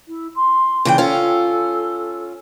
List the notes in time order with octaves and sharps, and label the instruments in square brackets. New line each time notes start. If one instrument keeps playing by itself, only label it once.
[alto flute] E4
C6
[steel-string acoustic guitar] C#3 E3 G5
[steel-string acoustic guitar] C#4 F4 [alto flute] A4